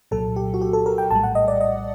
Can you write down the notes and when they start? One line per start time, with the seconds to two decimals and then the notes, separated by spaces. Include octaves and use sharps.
0.11 C2 A#2 F#3 A4
0.36 G4
0.54 F#4
0.62 G4
0.73 A4
0.86 A#4
0.98 G5
1.10 A#1 A2 G3 A5
1.23 F#5
1.35 D#5
1.48 D5
1.61 D#5